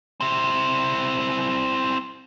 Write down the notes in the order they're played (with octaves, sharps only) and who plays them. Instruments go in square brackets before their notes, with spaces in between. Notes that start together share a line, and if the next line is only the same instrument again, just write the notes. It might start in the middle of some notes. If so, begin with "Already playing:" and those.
[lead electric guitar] C4 E4